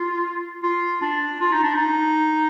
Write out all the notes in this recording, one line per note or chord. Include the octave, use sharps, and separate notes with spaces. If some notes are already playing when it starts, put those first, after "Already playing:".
Already playing: F4
F4
D4
F4
D#4
D4
D#4